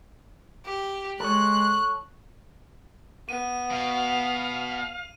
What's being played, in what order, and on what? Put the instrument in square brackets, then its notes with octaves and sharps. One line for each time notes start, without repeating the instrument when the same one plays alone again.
[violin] G4
[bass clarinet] G#3 [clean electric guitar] A4 C#5 [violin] F#6
[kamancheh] B3 [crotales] D#7
[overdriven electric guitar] B2 [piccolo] F5